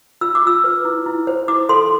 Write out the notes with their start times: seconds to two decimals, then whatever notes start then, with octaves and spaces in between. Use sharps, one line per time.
0.21 F4 E6
0.35 D6
0.43 F4 E6
0.64 B4
0.85 E4
1.06 E4
1.27 C5
1.48 E4 D6
1.69 A4 C6